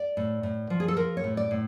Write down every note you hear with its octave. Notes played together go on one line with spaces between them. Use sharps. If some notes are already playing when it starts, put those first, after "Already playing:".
Already playing: D5
A2
A2
F3
G#4
A4
F3 A#4
C#5
A2
D5
A2